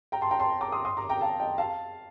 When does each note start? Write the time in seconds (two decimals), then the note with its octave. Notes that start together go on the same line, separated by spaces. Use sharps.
0.12 G5 A#5
0.21 A5 C6
0.31 G5 A#5
0.39 A5 C6
0.61 A#5 D6
0.72 C6 D#6
0.85 C6 D#6
0.97 A#5 D6
1.09 G5 A#5
1.21 F5 A5
1.40 D#5 G5
1.58 F5 A5